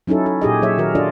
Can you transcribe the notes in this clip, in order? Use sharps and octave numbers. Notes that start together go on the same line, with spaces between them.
F#3 C#4 D#4 E4 A4
A4
A#2 G4 G#4 D#5
F#3 C#5 E5
D#3 F#4 A#4
D4 F4 A4 D5 D#5